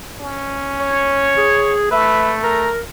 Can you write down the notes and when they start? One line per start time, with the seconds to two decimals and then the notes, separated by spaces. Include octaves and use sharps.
0.20 C#4
0.81 C#5
1.37 G#4
1.91 A3 B4 E5
2.43 A#4 A#5